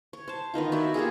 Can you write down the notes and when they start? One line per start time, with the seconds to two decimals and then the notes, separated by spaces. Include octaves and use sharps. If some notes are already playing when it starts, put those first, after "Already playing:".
0.13 C#5
0.28 C5 A5
0.54 D#3 B3 D#4 F4
0.72 F#4 C#5 D5 E5
0.94 A#3 F4 G4 G#4